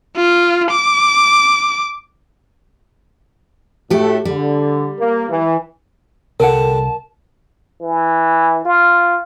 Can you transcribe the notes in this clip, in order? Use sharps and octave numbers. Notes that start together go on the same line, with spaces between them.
F4
D6
A2 A3 F#4 G4 A4
D3 G3
A#3
E3
C2 D3 G3 A#4 F#5 A5
E3
F4